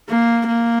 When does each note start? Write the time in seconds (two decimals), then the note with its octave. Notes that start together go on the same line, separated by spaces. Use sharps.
0.09 A#3
0.47 A#3